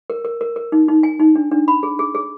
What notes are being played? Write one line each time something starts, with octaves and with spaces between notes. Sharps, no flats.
A#4
A#4
A#4
A#4
D#4
D#4
G#5
D#4
D4
D4
B5
G#4
G#4
G#4